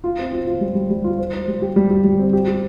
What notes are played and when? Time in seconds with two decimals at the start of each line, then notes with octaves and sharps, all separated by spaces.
0.04 F4
0.19 C4
0.33 F4
0.47 F4
0.61 G3
0.75 G3
0.90 G3
1.04 F4
1.18 C5
1.33 C5
1.48 G3
1.62 G4
1.76 G3
1.90 G4
2.04 G3
2.19 C4
2.33 G4
2.48 G4